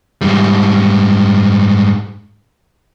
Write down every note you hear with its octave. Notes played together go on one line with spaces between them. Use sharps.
G#2 G3